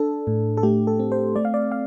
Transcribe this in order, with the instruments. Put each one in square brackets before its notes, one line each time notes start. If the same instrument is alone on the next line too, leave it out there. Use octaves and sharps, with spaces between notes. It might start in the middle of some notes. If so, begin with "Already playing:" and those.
Already playing: [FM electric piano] D4 A4
A2
A4
A3 G4
A4
C4
C5
A3 D5
F5
D5
F5